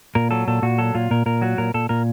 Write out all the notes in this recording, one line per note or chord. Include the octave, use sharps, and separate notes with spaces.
A#2 A#4
F#3 A4
A#2 A4
A#2 F#4
F#3 A4
A#2 F4
A#2 A#4
A#2 A#4
F#3 F#4
A#2 A#4
A#2 A4
A#2 A#4